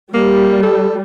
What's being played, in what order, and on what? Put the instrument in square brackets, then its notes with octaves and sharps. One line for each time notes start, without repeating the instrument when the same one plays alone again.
[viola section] G3 [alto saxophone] A#3
[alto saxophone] A4